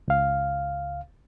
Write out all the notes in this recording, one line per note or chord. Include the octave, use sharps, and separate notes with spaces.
C#2 F5